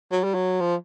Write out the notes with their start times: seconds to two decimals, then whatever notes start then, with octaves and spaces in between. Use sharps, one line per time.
0.12 F#3
0.23 G3
0.34 F#3
0.60 F3